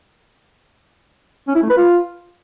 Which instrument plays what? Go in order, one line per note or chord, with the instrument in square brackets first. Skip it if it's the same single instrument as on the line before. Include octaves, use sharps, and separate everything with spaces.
[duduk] C#4
E4
A3
B4
F4